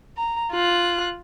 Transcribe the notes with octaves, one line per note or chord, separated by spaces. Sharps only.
A#5
F4 F#6